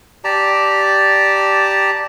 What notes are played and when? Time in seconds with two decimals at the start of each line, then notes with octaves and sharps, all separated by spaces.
0.24 G4 D5 A5 A#5